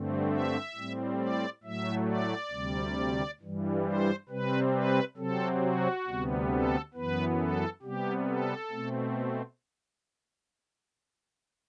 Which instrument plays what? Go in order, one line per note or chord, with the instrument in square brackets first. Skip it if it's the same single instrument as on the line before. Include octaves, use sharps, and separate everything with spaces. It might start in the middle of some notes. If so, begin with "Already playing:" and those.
Already playing: [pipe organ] G2 D3 A3 C4
E5
A2 G3 C4
D5
A2 F#3 A3 E5
D5
D2 C3 G3
G2 E3 G3
C5
C3 G3 C4 B4
B4
C3 F#3 C4 A4
F#4
D2 C3 G3 B3
A4
F#2 E3 B3 B4
A4
C3 G3 B3 G4
A4
B2 A3 C4